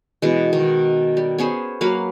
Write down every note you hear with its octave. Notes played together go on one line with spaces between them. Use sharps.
B2 E3 G#3
D#3
G3
B3 C#4 G#4 C5
F#3 A#3 B4 F5